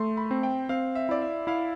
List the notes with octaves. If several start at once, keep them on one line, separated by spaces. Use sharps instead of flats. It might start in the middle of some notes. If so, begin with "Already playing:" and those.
Already playing: A3 C6
B5
C4
G5
C4 F5
E5
E4 D5
E5
E4 F5